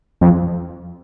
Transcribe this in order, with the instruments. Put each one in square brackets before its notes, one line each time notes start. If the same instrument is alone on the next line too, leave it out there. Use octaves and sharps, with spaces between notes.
[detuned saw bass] F2